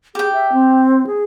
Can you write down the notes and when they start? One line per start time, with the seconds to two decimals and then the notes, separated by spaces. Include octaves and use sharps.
0.15 G4 G#4 G5
0.33 E5
0.53 C4
1.07 G#4